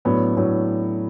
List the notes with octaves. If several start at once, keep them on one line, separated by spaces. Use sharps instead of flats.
A2 F#3 B3 D4
A2 F#3 B3 D4